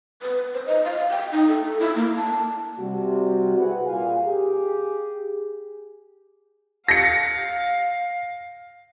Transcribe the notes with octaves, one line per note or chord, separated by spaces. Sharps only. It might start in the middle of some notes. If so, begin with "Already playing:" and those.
B4
C5
D#5
F5
G5
D#4
A4
E4
A#3
A5
C3 G3 F#4
E4 F#4 G#4 B4 F#5
A#2 F5 G#5
G4 G#4
F5 A#6 C#7